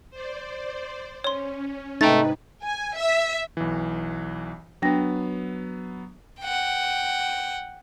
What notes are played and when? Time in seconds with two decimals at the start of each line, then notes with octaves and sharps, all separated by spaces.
0.10 C5 D5
1.24 C#4 C#5 C6
2.01 G#2 C3 A3 D#4 B4 G5 A#5 A6
2.63 G#5
2.97 E5
3.57 B1 E3
4.82 F#3 B3 D4 G5 A#6
6.40 F#5 G5